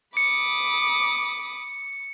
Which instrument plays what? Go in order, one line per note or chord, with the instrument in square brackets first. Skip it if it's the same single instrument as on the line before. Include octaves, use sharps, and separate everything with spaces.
[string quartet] B5 D6 D#6 [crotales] C#7